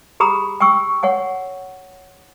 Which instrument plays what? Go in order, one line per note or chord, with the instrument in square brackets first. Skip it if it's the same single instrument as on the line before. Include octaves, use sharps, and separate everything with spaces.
[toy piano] G4 G#4 A#5 B5 D#6
G5 G#5 C#6 E6
C#5 F#5 G#5